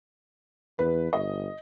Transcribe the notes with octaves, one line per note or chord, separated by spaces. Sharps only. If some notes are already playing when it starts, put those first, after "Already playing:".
E2 B4
G1 D#5